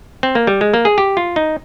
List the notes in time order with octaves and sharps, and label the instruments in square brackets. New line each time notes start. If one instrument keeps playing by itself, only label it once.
[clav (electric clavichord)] C4
A#3
G3
G#3
A#3
G#4
G4
F4
D#4